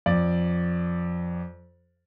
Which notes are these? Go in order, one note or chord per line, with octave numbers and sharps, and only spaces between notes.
F2 D5